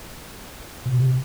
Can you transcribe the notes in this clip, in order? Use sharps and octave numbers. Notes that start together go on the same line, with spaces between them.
B2
C3